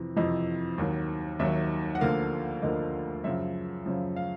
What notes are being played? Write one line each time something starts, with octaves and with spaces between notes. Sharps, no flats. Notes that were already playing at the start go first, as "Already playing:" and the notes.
Already playing: F2 C3 E3
F2 C3 E3 D#5
D#2 D#3 F#3
D#2 D#3 F#3 E5
F#5
D2 D3 F3 A#3 F5
D2 D3 F3 A#3 D#5
F#2 C#3 F3 E5
F#2 C#3 F3
F5